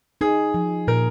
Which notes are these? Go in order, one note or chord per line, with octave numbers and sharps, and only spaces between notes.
D#4 G#4
F3
A#2 A#4